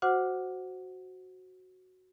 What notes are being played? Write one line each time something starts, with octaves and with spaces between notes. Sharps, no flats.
F#4 C5 F#5 D6 F6